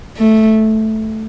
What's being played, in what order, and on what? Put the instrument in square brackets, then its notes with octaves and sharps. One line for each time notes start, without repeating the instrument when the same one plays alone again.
[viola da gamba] A3